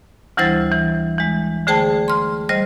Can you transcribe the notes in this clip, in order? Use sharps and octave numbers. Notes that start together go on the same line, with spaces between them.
D2 E3 G3 E4 C5 A6
E3
E3 G#3
D3 A3 G#4 C5 G5 A5
C6 F6
G3 C5 D#5 F6